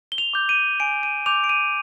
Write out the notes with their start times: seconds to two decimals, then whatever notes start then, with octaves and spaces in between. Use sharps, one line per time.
0.12 G7
0.18 F7
0.33 D6 G6
0.49 D#7
0.80 G#5 D7
1.03 D#7
1.26 D6 G6 F7
1.44 D7
1.49 D#7